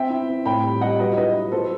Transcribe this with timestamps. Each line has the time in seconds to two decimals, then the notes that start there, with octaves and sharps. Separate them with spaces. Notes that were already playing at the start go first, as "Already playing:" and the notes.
Already playing: C4 E5 G5
0.10 E4
0.29 C4
0.46 A2 G5 B5
0.64 G3
0.81 G3 D#5 F#5
0.99 F#3 B4 D#5
1.17 E4 B4 D#5
1.35 E4
1.52 F#3 A4 C5